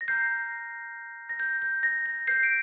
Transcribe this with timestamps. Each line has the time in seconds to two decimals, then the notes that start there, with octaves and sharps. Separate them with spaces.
0.01 A#6
0.08 A#5 F6 G6 C7
1.29 A#6
1.40 G6
1.62 G6
1.83 A#6
2.06 A#6
2.27 G6 C7
2.43 D7